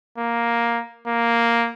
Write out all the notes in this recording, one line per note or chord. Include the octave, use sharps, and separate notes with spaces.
A#3
A#3